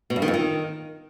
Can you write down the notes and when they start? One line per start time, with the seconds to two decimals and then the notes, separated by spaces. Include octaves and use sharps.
0.10 B2
0.16 G2
0.22 D#3
0.28 F2
0.34 D#3